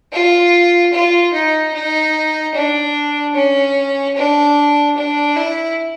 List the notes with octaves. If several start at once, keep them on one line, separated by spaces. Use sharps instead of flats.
F4
F4
D#4
D#4
D4
C#4
D4
D4
E4